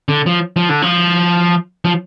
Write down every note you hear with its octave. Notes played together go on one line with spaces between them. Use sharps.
D3
F3
F3
D3
F3
F3